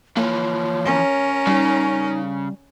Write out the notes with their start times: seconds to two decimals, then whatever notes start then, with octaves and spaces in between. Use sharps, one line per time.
0.17 E3 F3 A#3 C#5
0.85 C#4 A#4
1.47 C#3 G3 D#4